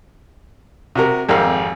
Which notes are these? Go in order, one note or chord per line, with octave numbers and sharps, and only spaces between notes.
C3 F#4 A#4
G#1 F2 G4 A#4 F5